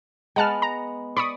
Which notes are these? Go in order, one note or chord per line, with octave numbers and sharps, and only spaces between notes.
G#3 B3 F#5 A5 F6
A#5
D5 B5 C#6 D#6